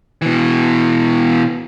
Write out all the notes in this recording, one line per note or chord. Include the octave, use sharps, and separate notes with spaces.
B2 E3